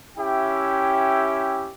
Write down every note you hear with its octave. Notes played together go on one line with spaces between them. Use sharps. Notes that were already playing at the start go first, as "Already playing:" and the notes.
C#4 E4 G4 E5 G5